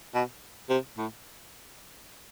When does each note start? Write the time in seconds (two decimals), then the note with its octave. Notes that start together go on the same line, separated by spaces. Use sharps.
0.14 B2
0.69 C3
0.98 A2